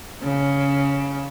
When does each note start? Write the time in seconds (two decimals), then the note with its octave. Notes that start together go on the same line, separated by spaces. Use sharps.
0.22 C#3